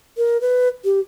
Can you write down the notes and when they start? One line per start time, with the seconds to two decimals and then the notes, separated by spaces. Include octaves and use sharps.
0.17 A#4
0.41 B4
0.85 G4